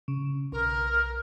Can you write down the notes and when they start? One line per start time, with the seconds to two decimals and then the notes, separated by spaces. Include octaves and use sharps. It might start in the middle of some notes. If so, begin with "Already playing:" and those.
0.08 C#3
0.52 B1 A#4